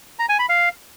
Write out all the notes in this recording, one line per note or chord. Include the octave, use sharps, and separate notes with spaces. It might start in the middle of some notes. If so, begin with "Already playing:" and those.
A#5
G#5
B5
F5